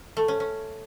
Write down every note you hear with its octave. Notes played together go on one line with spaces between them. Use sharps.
A3
C#4
C#4